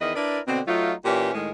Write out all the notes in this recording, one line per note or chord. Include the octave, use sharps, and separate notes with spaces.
E2 D#3 E3 B4 D#5
D4 E4 A#4 B4 D5
B2 D3 C4
F#3 A3 D#4 F4
A#2 E3 C#4 G4
A2 D#3 G#3